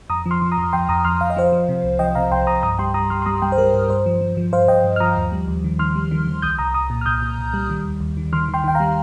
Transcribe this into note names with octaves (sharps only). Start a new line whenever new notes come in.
F2 A#5 D#6
F3
C6 F6
F3
A#5 D#6
F2
F2 G5 C6
F2 A#5 D#6
F2 C6 F6
F2 F5
D#5
F3 C5 F5
F3
C3
C2
F3 D#5 G5
C3 F5 A#5
C2 G5 C6
C2 A#5 D#6
G2 A#5 D#6
G3 G5 C6
G3 A#5 D#6
G3 C6 F6
C6
G3 A#5 D#6
G3 G5 C6
C5
G3 A#4
G2 A#4
G2 C5
F3
F3
F3
G2 C5 F5
G2 D#5 G5
G2
F6
F3 A#5 D#6
D#2
G3
D#2
D#3
D#3 C6 F6
G3
D#3
D#3
C2 D#6 G6
C2 A#5 D#6
C2 A#5 D#6
A#2
F6
C2 D#6 G6
A#2
C2
G3
D#3
D#2
D#2
D#3
D#3 C6 F6
D#3
G5 C6
D#3 G5
F5 A#5
G3